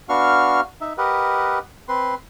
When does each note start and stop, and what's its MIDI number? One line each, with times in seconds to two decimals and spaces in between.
0.09 0.61 59
0.09 0.61 62
0.09 0.61 66
0.09 0.61 77
0.09 0.61 85
0.09 0.61 89
0.81 0.93 63
0.81 0.93 76
0.98 1.59 67
0.98 1.59 70
0.98 1.59 71
0.98 1.59 75
0.98 1.59 78
1.88 2.15 60
1.88 2.15 71
1.88 2.15 84